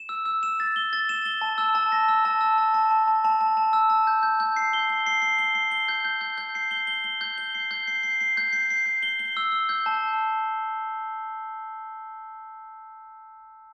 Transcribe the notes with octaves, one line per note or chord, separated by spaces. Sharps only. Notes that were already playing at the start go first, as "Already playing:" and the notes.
Already playing: E7
E6
E6
E7
A6
G7
A6
E7
G7
A5
E6
A5
A#6
E6
A5
E6
A5
A5
A5
A5
A5
A5
A5
E6
A5
G6
G6
G6
C7
G7
G7
C7
C7
G7
C7
G7
G6
G6
G6
G6
C7
G7
G7
G7
G6
G7
C7
G6
C7
C7
C7
G6
C7
C7
G6
G7
G7
E6
E6
G6
A5